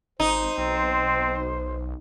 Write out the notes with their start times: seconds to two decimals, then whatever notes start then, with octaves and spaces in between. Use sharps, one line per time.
0.20 G#1 D#4 C5
0.58 B1 C4